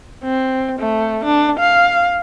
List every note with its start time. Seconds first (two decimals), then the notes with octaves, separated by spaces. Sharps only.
0.24 C4
0.79 A3
1.24 D4
1.59 F5